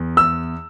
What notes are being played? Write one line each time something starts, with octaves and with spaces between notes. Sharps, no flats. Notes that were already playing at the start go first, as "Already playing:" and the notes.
Already playing: E2
E6